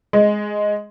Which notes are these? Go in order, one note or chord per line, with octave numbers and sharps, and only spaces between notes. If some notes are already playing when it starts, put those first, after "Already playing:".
G#3